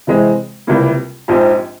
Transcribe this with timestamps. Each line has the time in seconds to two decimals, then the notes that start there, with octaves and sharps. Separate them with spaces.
0.07 C3 E3 G#3 C4
0.67 C#2 C3 G3 A#3 E4
1.28 A#1 G#2 F3 C4 G4